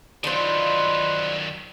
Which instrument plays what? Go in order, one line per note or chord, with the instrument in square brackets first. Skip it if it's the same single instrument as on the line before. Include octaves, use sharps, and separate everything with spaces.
[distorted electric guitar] D#3 F#3 [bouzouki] D4 C5 [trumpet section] D#4 F4 B4